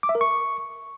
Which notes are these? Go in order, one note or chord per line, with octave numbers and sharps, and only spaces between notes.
D6
E5
A#4
C#6